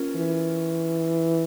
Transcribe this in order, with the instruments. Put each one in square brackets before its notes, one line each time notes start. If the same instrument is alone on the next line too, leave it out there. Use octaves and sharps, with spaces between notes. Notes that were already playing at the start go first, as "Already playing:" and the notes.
Already playing: [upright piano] A#3 C#4 F4
[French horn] E3